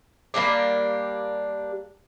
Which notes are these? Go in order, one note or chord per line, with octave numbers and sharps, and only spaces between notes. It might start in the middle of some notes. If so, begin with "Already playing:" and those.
G3 A#3 D4 G4